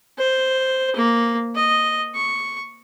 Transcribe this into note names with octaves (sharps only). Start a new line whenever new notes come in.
C5
A#3
D#5
C#6